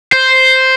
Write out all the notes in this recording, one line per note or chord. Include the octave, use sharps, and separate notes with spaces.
C5